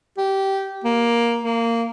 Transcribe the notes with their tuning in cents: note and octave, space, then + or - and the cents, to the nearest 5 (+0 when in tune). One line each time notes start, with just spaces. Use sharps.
G4 -15
A#3 +10
A#3 -15